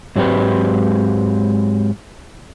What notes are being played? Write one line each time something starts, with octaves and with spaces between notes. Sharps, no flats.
G#2 F#3 G#3 C4 G4 B4